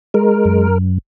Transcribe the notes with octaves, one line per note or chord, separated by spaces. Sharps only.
G#3 A#4
F#2